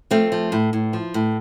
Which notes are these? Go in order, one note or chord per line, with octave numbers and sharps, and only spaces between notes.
F3 A3 C4
F3
A2
A2
F3
A2